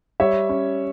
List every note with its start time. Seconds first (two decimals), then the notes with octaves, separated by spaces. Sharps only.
0.20 G3 C#5 E5
0.49 C#4